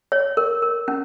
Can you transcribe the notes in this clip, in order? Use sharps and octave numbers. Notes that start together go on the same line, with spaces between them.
C#5
A#4
A#4
C#4